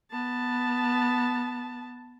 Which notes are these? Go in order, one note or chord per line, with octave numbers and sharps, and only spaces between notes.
B3 A5